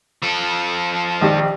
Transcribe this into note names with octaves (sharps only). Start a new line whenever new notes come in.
F3 A4
A#1 D#3 G4